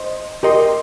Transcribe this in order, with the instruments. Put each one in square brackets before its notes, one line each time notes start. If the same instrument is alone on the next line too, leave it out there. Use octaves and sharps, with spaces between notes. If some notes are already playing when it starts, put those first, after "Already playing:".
Already playing: [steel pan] C5 D#5
[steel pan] G4 D#5 C6 [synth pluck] A#4